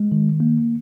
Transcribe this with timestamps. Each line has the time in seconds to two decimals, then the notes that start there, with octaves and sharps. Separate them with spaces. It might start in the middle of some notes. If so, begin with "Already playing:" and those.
Already playing: G#3
0.12 D#3
0.40 A#3